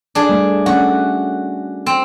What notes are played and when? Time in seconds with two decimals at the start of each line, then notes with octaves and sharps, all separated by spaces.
0.15 D4 G#4
0.29 G3 A3
0.66 A3 C#4 F#4 F#5
1.86 C4